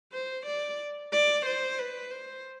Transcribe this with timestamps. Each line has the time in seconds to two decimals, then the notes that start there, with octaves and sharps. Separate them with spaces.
0.13 C5
0.46 D5
1.12 D5
1.46 C5
1.79 B4
2.11 C5